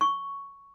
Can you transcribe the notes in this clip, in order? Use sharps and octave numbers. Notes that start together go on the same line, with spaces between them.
C#6